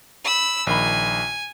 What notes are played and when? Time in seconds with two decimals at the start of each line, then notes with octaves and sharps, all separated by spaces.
0.24 B5 E6
0.67 A#1 D#3 G#5 B5